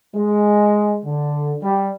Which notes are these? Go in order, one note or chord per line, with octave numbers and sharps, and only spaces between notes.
G#3
D3
G3